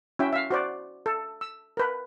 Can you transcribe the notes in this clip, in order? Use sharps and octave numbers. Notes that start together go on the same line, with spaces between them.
C#4 E4 F#4 E5 G5
E5 F5
F#4 C5 D5
A4
E6
A#4 B4